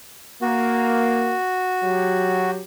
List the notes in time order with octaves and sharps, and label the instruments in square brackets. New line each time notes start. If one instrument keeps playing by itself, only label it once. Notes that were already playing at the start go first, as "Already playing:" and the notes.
[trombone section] A#3 [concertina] F#4
[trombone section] F#3 G4